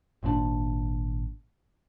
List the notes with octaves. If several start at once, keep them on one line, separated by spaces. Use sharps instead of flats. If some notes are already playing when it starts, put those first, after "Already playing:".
G#1 A#2 D3 D4